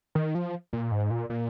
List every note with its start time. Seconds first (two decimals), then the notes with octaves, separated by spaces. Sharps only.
0.15 D#3
0.35 F3
0.73 A#2
0.92 G#2
1.11 A#2
1.30 A#2